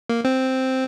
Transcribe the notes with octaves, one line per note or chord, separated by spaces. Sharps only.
A#3
C4